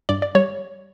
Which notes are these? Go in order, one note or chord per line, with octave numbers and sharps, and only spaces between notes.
G2 D5
D5
G3 C#5